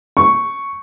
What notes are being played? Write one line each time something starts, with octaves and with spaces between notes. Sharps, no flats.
C#6